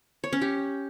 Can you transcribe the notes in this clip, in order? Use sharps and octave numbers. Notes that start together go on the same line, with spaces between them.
C#5
C#4
G4